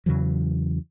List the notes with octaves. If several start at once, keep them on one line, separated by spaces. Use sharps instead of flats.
E2 C#3 E3 F#3